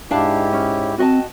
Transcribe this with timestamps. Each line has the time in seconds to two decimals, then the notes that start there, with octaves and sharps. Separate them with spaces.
0.11 G#2 D4 E4 G4 F5 A5
0.53 C#4
0.98 C4 F#4 D#5 A5